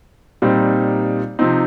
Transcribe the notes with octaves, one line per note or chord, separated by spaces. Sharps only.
A#2 G3 C4 D#4
C3 F3 C4 D#4